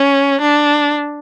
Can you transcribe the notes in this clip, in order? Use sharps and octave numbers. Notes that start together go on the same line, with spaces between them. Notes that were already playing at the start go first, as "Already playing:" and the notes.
Already playing: C#4
D4